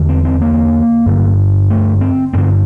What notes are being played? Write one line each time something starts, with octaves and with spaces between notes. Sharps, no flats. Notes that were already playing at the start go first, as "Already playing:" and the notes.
Already playing: E2 D3
C4
C4
A#3
G2 D3
A3
C4
G2 D3 C4